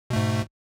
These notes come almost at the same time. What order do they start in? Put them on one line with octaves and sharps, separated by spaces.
B2 A3 G#2